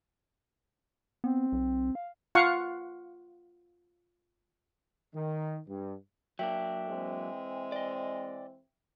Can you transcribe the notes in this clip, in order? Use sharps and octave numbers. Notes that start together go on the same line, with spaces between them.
B3 C4
B1
F5
F4 F5 F#5 C#6
D#3
G2
F#3 A#3 D4 E5 G5
E3 G#3 C4
D5 D#5